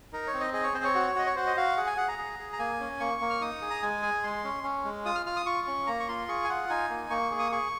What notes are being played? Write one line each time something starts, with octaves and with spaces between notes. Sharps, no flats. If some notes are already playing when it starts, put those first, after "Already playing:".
D#4 A#4
C#5
C4
D#5
G#4 D#5
C#5
C4 C5
C#5
F#4
F#4 D#5
C#5
F#4 C5
D#5
F#4 F5
G#4 F#5
G#5
G#4 F#5
A#5
G#4
G#4
A#5
A#3 G#5
C#4
A#3 C#6
A#3
F6
D#4 D#6
G#4
A#5
G#3 G#5
G#4
G#3 C6
C#4
C#4
G#3
F4 D#6
F6
F4 F6
D#6
F4 C#6
C#4
A#3 A#5
C#6
F4 C6
G#4 C#6
G#5
F4 F#5
D#4 G#5
A#3
A#3 C#6
G#4
D#6
G#4 C#6